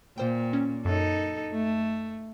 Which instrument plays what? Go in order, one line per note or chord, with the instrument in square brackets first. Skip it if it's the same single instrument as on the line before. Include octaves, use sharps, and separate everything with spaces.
[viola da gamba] A#2 [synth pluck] C5 G5
[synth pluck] C#4
[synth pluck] F#2 [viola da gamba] D#4 A4
[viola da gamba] A3